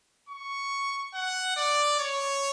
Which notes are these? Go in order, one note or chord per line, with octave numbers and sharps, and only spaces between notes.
C#6
F#5
D5
C#5